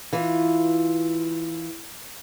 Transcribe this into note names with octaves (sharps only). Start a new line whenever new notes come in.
E3 F4